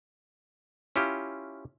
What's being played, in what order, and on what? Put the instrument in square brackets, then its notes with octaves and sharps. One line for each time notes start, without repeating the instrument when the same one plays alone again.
[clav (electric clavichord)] C#4 E4 F4 G4